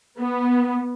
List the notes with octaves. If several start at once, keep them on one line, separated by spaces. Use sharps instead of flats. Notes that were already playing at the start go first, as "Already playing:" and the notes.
B3